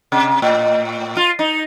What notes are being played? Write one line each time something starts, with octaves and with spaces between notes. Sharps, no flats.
C3
A2
F4
D#4